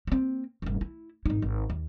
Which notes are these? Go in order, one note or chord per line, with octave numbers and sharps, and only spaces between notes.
A#3 C4
F1 G2
E4
G#1 D#4
G#1
D#2